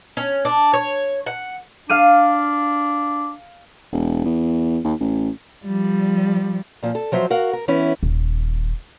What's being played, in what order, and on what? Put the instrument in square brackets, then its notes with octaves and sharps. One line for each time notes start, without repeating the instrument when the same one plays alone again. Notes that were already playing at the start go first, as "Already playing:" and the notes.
[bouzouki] C#4
D4
C#5
F#5
[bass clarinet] D4 [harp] F5 F6 D#7
[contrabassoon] E1
E2
D#2
A1
[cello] F3 G3
[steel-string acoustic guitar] A#2 F3
A4
F3 F#3 C5 E5
F#4 A#4 F5 F#5
A#4
E3 B3 C#4 E4
[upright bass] D#1